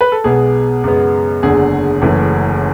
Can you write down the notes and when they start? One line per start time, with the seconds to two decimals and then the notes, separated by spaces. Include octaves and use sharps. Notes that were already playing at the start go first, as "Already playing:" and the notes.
0.01 B4
0.12 A4
0.24 B1 B2 G#3 B3 G#4
0.84 F#2 C#3 G#3 B3
1.43 F#1 E2 D3 G#4
2.02 F#1 F#2 E3 A3